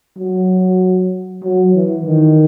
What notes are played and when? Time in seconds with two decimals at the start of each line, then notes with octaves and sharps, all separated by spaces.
0.18 F#3
1.44 F#3
1.75 E3
2.05 D#3